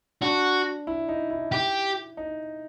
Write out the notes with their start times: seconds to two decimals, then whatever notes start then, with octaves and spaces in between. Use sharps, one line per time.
0.21 D4 F#4
0.87 E4
1.08 D#4
1.30 E4
1.52 G4
2.17 D#4